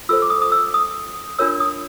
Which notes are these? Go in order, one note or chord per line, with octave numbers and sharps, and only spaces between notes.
F4 A4 C5 E6
D6
D#6
D#6
E6
D#6
D4 F4 A#4 C#5 E6
D#6